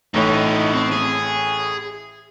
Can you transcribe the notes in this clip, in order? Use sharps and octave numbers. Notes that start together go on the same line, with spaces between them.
A1 A2 D#4 E4 C#5
C4
G#4